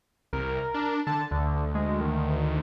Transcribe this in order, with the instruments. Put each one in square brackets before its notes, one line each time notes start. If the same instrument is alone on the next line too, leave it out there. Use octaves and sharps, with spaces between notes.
[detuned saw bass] C2 [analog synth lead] A#4
[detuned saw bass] D4
[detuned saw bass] D3 [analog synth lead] A5
[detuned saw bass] D2 [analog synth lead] D3
[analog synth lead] G#3
D#3